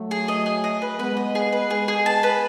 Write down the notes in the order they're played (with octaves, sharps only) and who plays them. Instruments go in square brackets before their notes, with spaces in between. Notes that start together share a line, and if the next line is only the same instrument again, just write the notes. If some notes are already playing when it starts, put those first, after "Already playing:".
Already playing: [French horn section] F#3 A3
[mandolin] G#4
D#5
G#4
D#5
B4
[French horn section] G#3 B3 [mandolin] B4
[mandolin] D#5
G#4
B4
[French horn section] G#3 B3 [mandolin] G#4
[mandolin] G#4
A5
B4